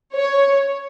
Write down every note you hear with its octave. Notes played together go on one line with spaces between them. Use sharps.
C#5